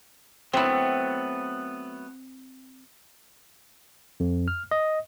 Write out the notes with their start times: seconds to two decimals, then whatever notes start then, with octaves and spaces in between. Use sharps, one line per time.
0.53 F#3 A3 B3 C4 E4
4.20 F2
4.48 F6
4.71 D#5